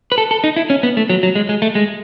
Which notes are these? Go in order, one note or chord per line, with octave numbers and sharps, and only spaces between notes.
B4
A4
A4
D#4
E4
C#4
B3
A3
F#3
F#3
G#3
G#3
A3
G#3